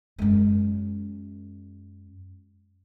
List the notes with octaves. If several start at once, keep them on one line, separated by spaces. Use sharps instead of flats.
F#2 G#3